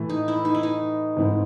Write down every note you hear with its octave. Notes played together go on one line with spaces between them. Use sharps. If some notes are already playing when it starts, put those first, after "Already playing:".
Already playing: A2 E3 A3
D#4
E4
D#4
E4
D#4
G#2 E3 A3 C4 E4